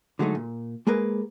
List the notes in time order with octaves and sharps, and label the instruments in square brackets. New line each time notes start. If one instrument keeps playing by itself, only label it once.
[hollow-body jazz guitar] D3 F#3 G#3 A3 D#4
A#2
G#3 A#3 G#4 A#4 B4